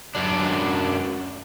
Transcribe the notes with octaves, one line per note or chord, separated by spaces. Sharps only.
F#2 D4